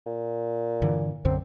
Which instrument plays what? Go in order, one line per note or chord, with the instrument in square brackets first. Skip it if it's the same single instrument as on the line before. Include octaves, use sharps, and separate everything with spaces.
[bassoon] A#2
[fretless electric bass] G2 D3 E3
[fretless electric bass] B1 F#2 D3 [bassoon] C4